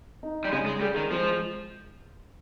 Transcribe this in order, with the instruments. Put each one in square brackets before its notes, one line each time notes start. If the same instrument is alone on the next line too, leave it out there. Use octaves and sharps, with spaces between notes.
[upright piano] D#4
[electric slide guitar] G3
[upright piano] C#3 [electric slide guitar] G#3
[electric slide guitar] G#3
[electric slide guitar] G3 [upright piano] G#4
[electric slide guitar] D#3
[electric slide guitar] F3 [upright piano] G#3